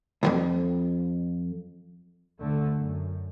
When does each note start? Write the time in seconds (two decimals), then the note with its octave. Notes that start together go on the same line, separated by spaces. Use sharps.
0.23 C2 F2
2.41 D2 D3 A3
2.76 F#2